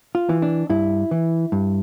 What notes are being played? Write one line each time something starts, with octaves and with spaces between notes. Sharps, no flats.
F4
E3
D4
G2 E4
E3
G2